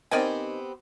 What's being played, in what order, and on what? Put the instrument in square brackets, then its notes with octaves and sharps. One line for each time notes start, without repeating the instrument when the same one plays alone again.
[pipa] D#3 D5 G#5 [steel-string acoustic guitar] B3 C4 G4